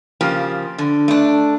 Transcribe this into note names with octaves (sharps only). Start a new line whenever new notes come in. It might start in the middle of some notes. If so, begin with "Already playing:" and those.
C#3 F3 A#3 G4
D3
A3 D4